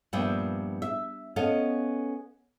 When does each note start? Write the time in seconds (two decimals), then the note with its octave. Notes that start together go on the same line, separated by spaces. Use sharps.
0.13 G2 A#2 F3 B3 E5 G5
0.82 E5
1.36 B3 C#4 A4 D#5 F5